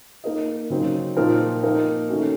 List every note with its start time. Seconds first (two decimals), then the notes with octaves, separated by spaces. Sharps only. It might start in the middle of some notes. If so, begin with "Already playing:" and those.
0.24 A#3 D#4 A#4 D#5
0.70 C#3 F#3 C4 D#4
1.17 A#2 F3 C4 D#4 A#4
1.63 A#3 D#4 A#4
2.09 D#3 A3 C#4 F#4